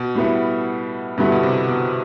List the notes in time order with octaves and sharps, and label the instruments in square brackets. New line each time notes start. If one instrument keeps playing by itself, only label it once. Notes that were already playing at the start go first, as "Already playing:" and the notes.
Already playing: [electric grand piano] B2
[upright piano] A2 G3 B3 E4
[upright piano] G2 D3 G3 B3 E4 [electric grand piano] B2
[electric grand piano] B2
C3
B2